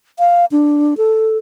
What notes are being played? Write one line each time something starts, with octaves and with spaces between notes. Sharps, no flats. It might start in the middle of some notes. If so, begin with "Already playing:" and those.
F5
D4
A4